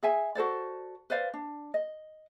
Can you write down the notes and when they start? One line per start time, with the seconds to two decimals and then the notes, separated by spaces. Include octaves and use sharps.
0.03 G#4 E5 G#5
0.35 F#4 A4 C5 D5
1.10 B4 C5 D5 F5
1.34 D4
1.74 D#5